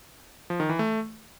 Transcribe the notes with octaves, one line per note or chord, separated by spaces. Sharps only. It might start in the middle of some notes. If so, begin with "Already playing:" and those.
F3
D#3
E3
A3